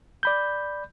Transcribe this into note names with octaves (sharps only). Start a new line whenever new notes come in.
D5 B5 G6